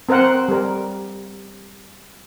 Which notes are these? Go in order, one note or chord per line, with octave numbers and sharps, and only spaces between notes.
C4 A#4 C5 F#5
G3 A#4